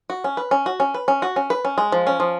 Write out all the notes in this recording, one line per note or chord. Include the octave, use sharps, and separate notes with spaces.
F#4
C#4
B4
C#4
F#4
C#4
B4
C#4
F#4
C#4
B4
C#4
G#3
F3
C#4
F3